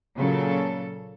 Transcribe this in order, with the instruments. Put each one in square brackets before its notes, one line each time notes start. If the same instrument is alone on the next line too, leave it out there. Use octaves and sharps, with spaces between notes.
[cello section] A#2 C#3 F#3 A4